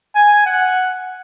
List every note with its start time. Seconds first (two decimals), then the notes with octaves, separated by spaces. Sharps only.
0.16 G#5
0.46 F#5